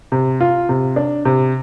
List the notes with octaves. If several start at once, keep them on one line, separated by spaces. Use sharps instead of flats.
C3
F4
C3
D4
C3